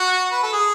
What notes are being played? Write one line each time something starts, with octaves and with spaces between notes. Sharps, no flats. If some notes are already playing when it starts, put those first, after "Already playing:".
Already playing: F#4
B4
A4
G#4